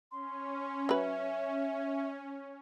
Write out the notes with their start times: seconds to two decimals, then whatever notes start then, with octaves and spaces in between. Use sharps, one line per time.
0.12 C#4 C6
0.89 F#3 B4 E5